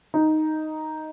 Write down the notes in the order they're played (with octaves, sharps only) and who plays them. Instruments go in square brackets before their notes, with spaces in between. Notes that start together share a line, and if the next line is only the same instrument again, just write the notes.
[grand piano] D#4